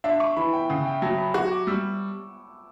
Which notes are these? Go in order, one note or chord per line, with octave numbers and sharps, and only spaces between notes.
D4 E5
C#6
E3 B5
G5
C#3 F#5
G5
F#3 A5
B5
F#4 C#6
D6
G3 E6